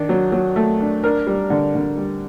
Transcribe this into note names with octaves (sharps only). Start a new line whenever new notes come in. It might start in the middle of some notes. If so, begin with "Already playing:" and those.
Already playing: D#3 D4
F#3
F#3
A3
D4
D4 A#4
G3
D3
D3
G3